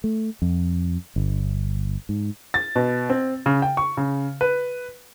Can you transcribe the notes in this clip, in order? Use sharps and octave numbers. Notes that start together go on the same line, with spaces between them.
A3
F2
G1
G#2
A6
B2
C4
C#3
G5
C#6
C#3
B4